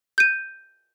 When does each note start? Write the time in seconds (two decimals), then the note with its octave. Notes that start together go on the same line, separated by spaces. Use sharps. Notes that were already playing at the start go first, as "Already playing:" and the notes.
0.18 G6 D#7